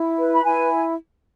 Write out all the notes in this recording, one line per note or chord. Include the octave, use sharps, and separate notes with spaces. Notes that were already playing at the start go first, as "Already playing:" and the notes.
Already playing: E4
B4
B5
E4 G#5